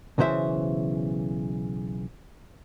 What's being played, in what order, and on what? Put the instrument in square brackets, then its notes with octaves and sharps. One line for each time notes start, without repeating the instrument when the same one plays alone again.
[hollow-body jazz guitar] B1 C#3 E3 C5 E5